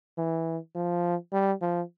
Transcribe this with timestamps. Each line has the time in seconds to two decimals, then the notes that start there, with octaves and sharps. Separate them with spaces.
0.17 E3
0.75 F3
1.33 G3
1.62 F3